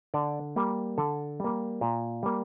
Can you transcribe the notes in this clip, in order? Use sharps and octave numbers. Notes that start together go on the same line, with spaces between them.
D3 D5
G3 A#3
D3 A4
G3 A#3
A#2
G3 A#3